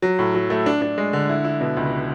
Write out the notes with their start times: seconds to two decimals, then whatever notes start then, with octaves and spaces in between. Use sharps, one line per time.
0.02 F#3
0.19 A2
0.35 F#3
0.50 A3
0.66 D4
0.82 D4
0.98 G#3
1.13 D3
1.29 E4
1.44 E4
1.61 B2
1.77 C#2